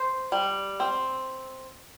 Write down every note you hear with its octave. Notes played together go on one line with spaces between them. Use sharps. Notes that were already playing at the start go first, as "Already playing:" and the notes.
Already playing: C5
G3
C4